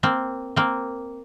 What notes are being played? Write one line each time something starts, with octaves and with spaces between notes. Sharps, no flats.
A#3 C4
A#3 C4